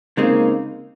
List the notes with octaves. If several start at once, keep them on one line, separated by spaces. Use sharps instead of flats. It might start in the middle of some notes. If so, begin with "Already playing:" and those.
C#3 G#3 A#3 C4 D#4